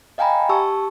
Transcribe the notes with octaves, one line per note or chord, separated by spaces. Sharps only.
D#5 F5 G5 G#5 A#5 B5
G4 A5 C#6 E6